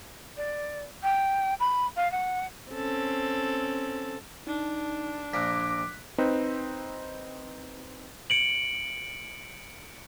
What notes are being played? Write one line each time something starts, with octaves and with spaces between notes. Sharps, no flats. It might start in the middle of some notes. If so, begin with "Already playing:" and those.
D5
G5
B5
F5
F#5
C4 C#4 A4
D4 D#4
A#1 A#2 A#3 D6 F#6 B6
C4 D#4 B4
C#7 D7 F#7